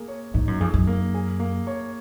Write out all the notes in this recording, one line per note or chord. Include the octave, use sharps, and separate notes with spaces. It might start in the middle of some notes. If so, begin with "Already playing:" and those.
Already playing: A#3 G#4
C#5
G#2 D#4
F#2
F2 G#4
F#2
A#3
G#4
A#3
C#5